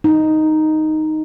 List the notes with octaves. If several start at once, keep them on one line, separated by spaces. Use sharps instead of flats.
D#4